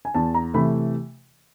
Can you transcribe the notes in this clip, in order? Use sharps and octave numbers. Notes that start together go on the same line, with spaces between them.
G#5
E2 A5
A#5
C3 E3 A3 B5